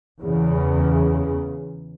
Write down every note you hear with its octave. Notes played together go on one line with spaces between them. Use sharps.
E2 C#3